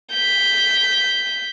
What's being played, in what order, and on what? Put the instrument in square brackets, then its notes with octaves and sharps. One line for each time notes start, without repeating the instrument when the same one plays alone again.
[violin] G6 B6